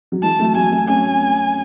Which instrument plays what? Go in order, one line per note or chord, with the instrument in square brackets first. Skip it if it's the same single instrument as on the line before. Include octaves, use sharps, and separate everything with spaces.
[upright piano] F#3
[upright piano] E3 G#3 [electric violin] A5
[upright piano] F#3 A3
[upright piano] F#3 A3 [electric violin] G#5
[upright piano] F#3 A3
[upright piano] A3 C#4 [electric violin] G#5